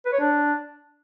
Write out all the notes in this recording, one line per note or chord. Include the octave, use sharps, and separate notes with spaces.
B4
C#5
D4